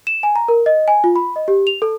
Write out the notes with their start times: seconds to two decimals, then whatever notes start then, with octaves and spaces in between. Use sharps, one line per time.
0.07 E7
0.23 G#5
0.36 A#5
0.48 A#4
0.66 D#5
0.88 G#5
1.04 F4
1.16 B5
1.36 D#5
1.48 G4
1.67 F7
1.82 A4